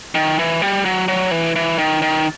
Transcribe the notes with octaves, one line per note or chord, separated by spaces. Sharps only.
D#3
E3
G3
F#3
F#3
E3
E3
D#3
D#3